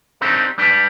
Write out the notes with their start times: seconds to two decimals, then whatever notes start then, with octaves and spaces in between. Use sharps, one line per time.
0.21 C4 D4 D#4 G4 A#4
0.58 G3 D4 B4 D5